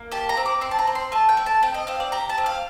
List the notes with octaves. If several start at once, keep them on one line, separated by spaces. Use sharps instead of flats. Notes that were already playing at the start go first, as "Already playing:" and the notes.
Already playing: A#3
G4 A5
A#5
C4
D6
C4 C6
A5
A#5
C4
C6
A3 A5
G5
A3
A5
C4 G5
D#5
C4 F5
D5
G4 A#5
A5
C4
F5